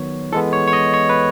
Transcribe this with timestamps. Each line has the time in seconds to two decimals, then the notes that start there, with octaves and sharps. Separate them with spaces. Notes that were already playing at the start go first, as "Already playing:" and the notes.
Already playing: D#3 F#3 B3 C#5
0.32 E3 G#3 B3 A4
0.53 C#5
0.68 C#5
0.73 D#5
0.94 C#5
1.09 B4